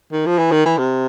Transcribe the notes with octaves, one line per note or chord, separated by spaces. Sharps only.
D#3
F3
E3
D#3
E3
C3